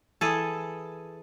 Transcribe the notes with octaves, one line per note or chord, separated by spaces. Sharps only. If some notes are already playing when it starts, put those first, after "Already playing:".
E3 G#4 A4